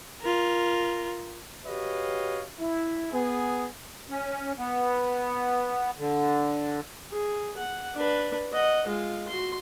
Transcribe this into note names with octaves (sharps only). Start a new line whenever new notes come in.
F4 A#4
F#4 G4 B4 C#5 D#5 F5
E4
B3 G#4
C#4
B3
D3
G#4
F#5
D4 B4
D#5 F#5
G#3 F4
F#4 C6